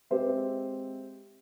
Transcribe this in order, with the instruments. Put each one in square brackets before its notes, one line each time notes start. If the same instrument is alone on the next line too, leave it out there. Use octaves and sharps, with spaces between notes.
[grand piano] G#3 C4 G4 C5 E5